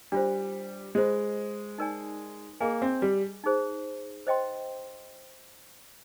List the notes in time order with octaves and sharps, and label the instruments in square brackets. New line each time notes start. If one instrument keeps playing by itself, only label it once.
[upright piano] G3 [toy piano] D4 F4 C5
[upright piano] G#3 [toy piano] F4 C5 D#5
[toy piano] D#4 A#4 D5 G#5
[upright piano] A#3 [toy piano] G#4 D#5 G#5
[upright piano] C4
G3
[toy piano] D#4 G#4 C5
C5 D#5 G5 C6